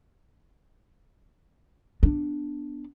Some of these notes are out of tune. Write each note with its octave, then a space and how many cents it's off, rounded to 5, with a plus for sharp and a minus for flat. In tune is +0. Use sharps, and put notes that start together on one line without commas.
B3 +0 D4 +0